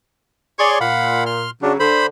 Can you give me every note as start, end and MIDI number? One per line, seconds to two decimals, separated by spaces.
0.59 0.79 68
0.59 0.79 73
0.59 0.79 74
0.59 0.79 84
0.81 1.48 46
0.81 1.24 77
0.81 1.24 78
0.81 1.24 83
1.26 1.50 84
1.26 1.50 89
1.62 1.79 49
1.62 1.79 54
1.62 1.73 62
1.80 2.07 50
1.80 2.06 72
1.80 2.06 83